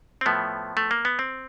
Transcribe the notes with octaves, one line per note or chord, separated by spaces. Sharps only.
C4
A2 F3 A3 B3
A3
A#3
B3
C4